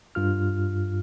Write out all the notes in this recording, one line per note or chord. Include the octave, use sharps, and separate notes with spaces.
G2 F4 F6